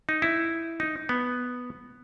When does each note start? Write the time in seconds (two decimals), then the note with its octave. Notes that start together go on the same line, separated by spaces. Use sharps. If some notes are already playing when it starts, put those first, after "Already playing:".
0.09 D#4
0.22 E4
0.80 D#4
1.09 B3